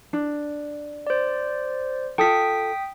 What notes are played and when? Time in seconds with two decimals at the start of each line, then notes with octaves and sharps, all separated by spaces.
0.13 D4
1.07 C5 D5
2.18 F4 A4 G5 D#6 B6